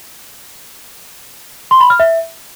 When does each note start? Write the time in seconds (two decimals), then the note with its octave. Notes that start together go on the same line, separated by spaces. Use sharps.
1.71 C6
1.81 B5
1.90 F6
2.00 E5